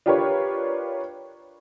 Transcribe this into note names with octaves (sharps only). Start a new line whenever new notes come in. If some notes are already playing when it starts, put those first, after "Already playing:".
D4 F4 G4 A#4 B4 C#5